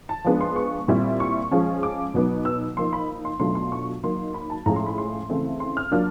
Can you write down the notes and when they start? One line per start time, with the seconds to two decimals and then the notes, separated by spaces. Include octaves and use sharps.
0.09 A5
0.24 F3 G#3 B3 D4
0.41 C6
0.56 C#6
0.88 A#2 G3 C4 E4
1.20 C#6
1.51 F3 G#3 C#4
1.83 D6
2.14 B2 F#3 B3 D#4
2.45 E6
2.77 F3 A#3 D#4 C6
2.93 B5
3.25 C6
3.39 B2 F#3 A3 D4 F4 C6
3.55 C6
3.72 C#6
4.04 F#3 A#3 D#4 C6
4.34 B5
4.50 A5
4.66 A2 F3 G#3 C#4 A#5
4.76 C6
4.86 B5
4.98 C6
5.30 C#3 E3 A3 C4 E4
5.60 C6
5.77 F6
5.92 F#3 A#3 D4 F4 F6